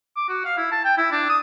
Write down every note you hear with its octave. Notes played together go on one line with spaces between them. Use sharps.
D6
F#4
F5
E4
A5
G5
E4
D4
D#6